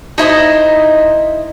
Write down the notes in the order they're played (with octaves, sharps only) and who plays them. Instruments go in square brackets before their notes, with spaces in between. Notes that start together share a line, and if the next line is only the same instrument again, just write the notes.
[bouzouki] D#4 E4 C5 D#5